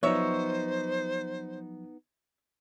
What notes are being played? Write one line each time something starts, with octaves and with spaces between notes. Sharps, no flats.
F3 F#3 B3 D#4 C5 C#5 E5